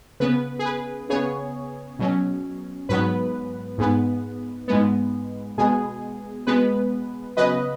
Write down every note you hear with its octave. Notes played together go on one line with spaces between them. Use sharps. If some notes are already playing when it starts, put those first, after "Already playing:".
C#3 B3 B4
G#4
B4
C#3 B3 G#4 C#5
B2 F#3 C#4
G#2 F#3 B3 B4
G#2 G#3 B3
G#2 G#3 B3
B2 G#3 B3 G#4
B2 G#3 B3 B4
C#3 F#3 B3 B4 D#5